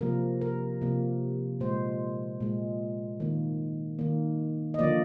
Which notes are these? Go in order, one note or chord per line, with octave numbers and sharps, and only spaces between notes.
C3 F3 A#3 A#4
A#4
C3 F3 A#3
A#2 G#3 C5
A#2 G#3
D#3 A#3
D#3 A#3
D#5
D3 F3 A#3 D5